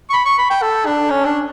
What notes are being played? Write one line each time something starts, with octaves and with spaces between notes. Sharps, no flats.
C#6
B5
C#6
B5
G5
A4
D4
C#4
D4